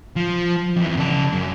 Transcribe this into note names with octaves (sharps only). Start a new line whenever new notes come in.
F3
F2 E3
C#3 A5
F#2